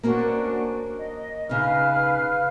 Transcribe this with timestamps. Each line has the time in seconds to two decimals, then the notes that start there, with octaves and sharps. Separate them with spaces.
0.03 A#3 C#4 D4 F#4 C5
0.96 D#5
1.49 C#3 D#4 B4 F5 F6